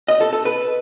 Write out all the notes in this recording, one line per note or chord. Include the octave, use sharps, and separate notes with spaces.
D#5
A4
A4
B4